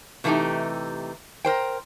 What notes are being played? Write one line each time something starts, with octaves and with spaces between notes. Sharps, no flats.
C3 E3 A3 B3 D#4 G4
A#4 C5 G5